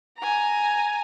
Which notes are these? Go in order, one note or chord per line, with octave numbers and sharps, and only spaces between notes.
G#5 A#5